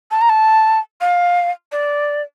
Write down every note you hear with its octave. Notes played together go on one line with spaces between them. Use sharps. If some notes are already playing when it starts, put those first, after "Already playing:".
A5
A#5
A5
F5
D5